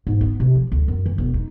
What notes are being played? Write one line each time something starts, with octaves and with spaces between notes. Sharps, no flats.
G#2
B3
C3
F3
D2
F#2
E3
E1
D#4